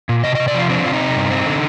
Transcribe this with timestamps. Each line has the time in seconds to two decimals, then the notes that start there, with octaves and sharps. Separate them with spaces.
0.09 A#2
0.24 C3 D#5
0.35 C3 D#5
0.48 D5
0.54 F3 F4
0.70 C4 D4
0.85 C3 F4
0.93 D#4
1.00 C3
1.15 G2
1.31 C4
1.46 D3